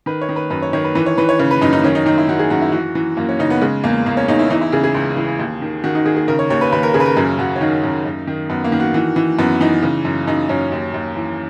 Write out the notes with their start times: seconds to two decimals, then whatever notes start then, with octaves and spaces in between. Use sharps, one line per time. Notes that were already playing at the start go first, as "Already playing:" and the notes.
0.06 D#3 B4
0.22 C#5
0.29 D#3
0.36 B4
0.50 F#2 B4
0.62 C#5
0.73 D#3 C#5
0.84 B4
0.95 E3 B4
1.06 C#5
1.18 E3 B4
1.29 C#5
1.39 C#3 C#5
1.51 B4
1.61 F#2 D#4
1.73 D#4
1.84 D#3 C#4
1.95 D#4
2.06 D#3 D#4
2.18 E4
2.29 D#3 F#4
2.39 G#4
2.50 F#2 F#4
2.62 E4
2.72 E3 F#4
2.95 E3
3.17 F#2 A#3
3.29 C#4
3.39 C#3 D#4
3.50 B3
3.62 C#3 G#3
3.84 E2 A#3
4.06 E2 A#3
4.17 C#4
4.28 E2 D#4
4.39 E4
4.50 E3 D#4
4.61 E4
4.72 C#3 G#4
4.84 G#4
4.94 C#2
5.17 E3
5.39 D#2
5.62 D#3
5.84 D#3 F#4
5.95 D#4
6.06 D#3 G#4
6.17 G#4
6.28 C#3 A#4
6.39 C#5
6.50 D#2 C#5
6.61 B4
6.72 D#2 B4
6.83 A#4
6.94 C#3 G#4
7.00 B4
7.06 A#4
7.17 F#2 G#4
7.39 F#2 F#4
7.56 C#4
7.61 D#3 D#4
7.84 F#2
8.05 F#2
8.27 D#3
8.50 F#2 B3
8.64 A#3
8.72 D#3
8.80 F#4
8.94 E3
9.16 E3
9.38 F#2 B3
9.61 E3 D#4
9.83 C#3
10.05 F#2
10.27 F#2 D#4
10.49 F#2 C#4
10.72 D#2
10.94 D#2
11.16 E3